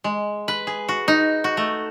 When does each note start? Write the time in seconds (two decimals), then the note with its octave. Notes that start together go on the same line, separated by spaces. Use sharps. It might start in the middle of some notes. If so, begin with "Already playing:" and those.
0.04 G#3
0.48 B4
0.67 G#4
0.89 F#4
1.08 D#4
1.44 F#4
1.57 A3